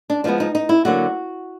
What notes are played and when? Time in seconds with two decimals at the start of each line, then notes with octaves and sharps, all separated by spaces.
0.10 D4
0.24 F3 G#3 B3 D4
0.40 D#4
0.55 D#4
0.69 E4
0.85 D3 F#3 A#3 F#4